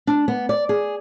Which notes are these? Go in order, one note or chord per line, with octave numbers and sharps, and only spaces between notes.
D4
B3
D5
G#4